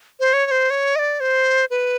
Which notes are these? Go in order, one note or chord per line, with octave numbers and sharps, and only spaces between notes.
C5
C#5
C#5
C5
C#5
D#5
D5
C5
B4